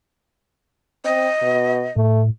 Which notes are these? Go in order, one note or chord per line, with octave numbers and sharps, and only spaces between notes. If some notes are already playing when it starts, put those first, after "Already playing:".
C4 D#5
B2
A2 A3